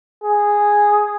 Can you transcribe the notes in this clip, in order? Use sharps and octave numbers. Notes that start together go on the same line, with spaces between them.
G#4